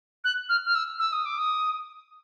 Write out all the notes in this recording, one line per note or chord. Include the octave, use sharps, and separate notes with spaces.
F#6
F6
F6
E6
E6
D#6
D6
D#6